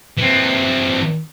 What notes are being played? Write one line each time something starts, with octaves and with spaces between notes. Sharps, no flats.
E3 C4